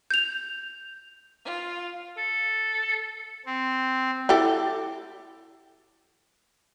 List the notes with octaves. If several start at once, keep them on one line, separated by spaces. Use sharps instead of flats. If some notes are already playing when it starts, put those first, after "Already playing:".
G6 F7
F4
A4
C4
E4 G4 A4